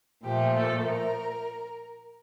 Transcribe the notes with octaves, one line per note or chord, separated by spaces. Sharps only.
A#2 F3 A3 G4
A4
A#4